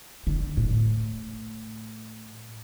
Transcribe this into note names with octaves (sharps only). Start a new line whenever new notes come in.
D3
A2